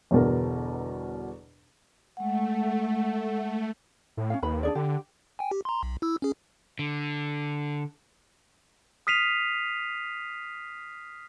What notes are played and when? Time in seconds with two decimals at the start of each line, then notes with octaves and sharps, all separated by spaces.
0.11 G1 E2 B2 A#4
2.17 G#3 A3 F#5
4.17 A2
4.30 C#4 F5
4.42 D#2 B4 B5
4.63 D4 G#4 D5
4.75 D3 G4
5.39 G5 G#5
5.51 G4
5.65 A#5 C6
5.83 B1
6.02 E4 E6
6.22 C#4 G#4
6.79 D3
9.07 D#6 F6 B6 C7 D#7 F7